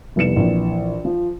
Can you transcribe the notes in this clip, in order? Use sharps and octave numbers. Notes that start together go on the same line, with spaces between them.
F1 C2 B3 C#7 E7
A#1 E3
F3